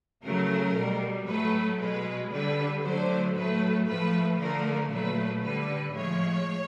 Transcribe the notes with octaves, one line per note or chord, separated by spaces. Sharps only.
C#3 F#3 A3 A#4
B2 G3
A2 F#3 A3 B4
B2 G#3 B4
D3 G3 B4
D3 F#3 A3 C5
A2 F#3 A3 B4
A2 F3 A3 B4
D3 F3 A3 A#4
A#2 F#3 A3 B4
D3 G3 B4
A2 F3 G#3 C#5